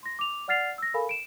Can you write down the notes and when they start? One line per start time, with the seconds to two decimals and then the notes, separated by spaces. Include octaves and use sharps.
0.03 C6 A#6
0.19 D6 F7
0.48 D5 F#5 F6 A6 C7 F7
0.78 E6 A#6
0.94 A4 A#4 F5 G#5 B5
1.09 D7 E7